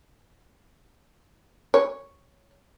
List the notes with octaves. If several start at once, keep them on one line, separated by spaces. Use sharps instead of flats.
C#5